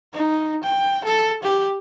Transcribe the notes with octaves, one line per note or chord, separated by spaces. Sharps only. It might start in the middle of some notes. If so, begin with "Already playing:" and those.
D#4
G5
A4
G4